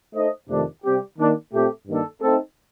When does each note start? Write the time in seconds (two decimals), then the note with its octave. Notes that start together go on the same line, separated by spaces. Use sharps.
0.14 A3 D#4 A4 C5 D#5
0.49 F2 C3 D#3 A3 D4
0.83 C3 G3 C4 G4
1.19 D#3 A#3 D4
1.53 A#2 A3 C4 G4
1.87 G2 D#3 A#3 D4 A4
2.21 A3 C4 D#4 A4